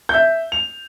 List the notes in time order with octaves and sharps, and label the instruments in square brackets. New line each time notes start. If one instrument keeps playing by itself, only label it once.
[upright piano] E5 G6
F7